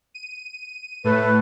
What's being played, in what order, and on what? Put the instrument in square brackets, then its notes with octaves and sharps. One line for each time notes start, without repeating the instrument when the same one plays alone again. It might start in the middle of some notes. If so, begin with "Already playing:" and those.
[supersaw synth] D#7
[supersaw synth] A2 A3 [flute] B4